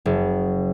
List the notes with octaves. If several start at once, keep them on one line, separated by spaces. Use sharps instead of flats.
F#1